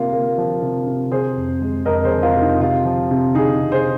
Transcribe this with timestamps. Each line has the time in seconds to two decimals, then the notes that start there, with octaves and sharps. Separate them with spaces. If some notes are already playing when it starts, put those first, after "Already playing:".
Already playing: C3 A#3 F4
0.13 A#3
0.38 F3
0.62 C3
0.87 C3
1.11 C3 G#4 C5
1.37 F2
1.62 G#3
1.85 F2 A#4 D#5
2.04 G#4 C5
2.11 F2
2.23 F4 A#4
2.36 C3
2.42 D#4
2.60 C3 F4
2.85 F3
3.11 C3
3.35 C3 D#4 G#4
3.60 C3
3.72 G#4 C5